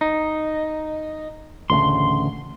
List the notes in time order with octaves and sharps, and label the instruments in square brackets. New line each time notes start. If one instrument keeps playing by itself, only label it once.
[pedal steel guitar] D#4
[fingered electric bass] A1 D2 C#3 [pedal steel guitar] C6